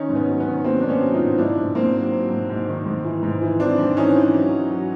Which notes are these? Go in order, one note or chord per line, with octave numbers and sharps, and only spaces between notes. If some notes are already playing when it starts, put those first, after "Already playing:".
Already playing: D#3 C#4 D#4
G#2
B3 C#4
F#3
B3 C#4
D#3
F#3 A#3 C4
G#2 D4
B3 C#4
F#3
D#4 F4
G#2
G#2 D4 E4
G#2
G#2 A#3 C4
F#3
F#3
G#2
G#2
D#3
G#2
E3
G#2
E3
E3 C4 D4
G#2
E3 C#4 D#4
E3
F#3
F#3
F#3